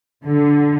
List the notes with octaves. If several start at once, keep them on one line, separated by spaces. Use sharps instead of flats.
D3